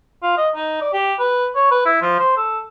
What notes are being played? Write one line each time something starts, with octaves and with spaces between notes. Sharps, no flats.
F4
D#5
D#4
D5
G4
B4
C#5
B4
E4
F3
C5
A4